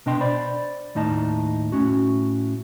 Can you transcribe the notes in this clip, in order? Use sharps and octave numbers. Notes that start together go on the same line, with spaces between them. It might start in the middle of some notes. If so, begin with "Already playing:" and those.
B2 D4 D#5 G5 C6
C5 D5 B5
D#2 A2 D#4 D#5 A5
A2 C#4 F#4